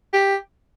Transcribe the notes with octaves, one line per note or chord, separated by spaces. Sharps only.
G4